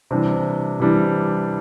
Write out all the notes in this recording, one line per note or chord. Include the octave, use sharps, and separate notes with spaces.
C3 E3 G3 D4
C3 E3 G3 D4